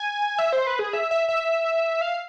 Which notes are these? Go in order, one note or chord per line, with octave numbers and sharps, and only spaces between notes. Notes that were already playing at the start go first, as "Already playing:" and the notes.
Already playing: G#5
E5
C5
B4
G#4
E5
E5
E5
F5